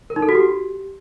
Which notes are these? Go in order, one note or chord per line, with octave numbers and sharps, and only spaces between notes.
A#4
D#4
A4
F#4
G4